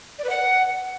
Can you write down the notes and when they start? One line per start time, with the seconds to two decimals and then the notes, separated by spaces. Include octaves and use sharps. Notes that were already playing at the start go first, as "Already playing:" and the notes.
0.19 D5
0.24 B4
0.30 F#5